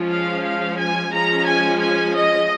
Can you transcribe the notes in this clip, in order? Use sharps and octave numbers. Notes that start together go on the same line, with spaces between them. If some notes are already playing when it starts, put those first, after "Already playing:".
Already playing: F3 G#3 C#4
F5
F5
G#5
F3 G#3 C#4 A#5
G#5
G#5
D#5